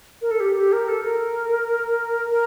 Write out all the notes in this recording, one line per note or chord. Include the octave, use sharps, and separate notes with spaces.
A#4
A4
G4
G4
A#4
A4
A#4
A#4